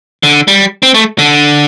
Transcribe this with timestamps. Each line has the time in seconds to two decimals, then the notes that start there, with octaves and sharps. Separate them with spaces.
0.23 D3
0.48 G3
0.83 C4
0.94 A3
1.19 D3